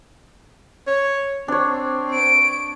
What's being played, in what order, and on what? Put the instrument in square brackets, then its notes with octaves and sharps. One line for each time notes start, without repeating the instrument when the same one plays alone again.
[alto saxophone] C#5
[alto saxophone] C4 [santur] D4 C#5
[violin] D7